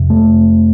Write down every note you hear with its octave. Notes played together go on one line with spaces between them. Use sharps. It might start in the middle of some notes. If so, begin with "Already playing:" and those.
Already playing: F2 C3
A3